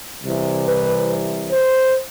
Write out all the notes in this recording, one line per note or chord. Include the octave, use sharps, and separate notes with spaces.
C2 C3 E3
B4
C5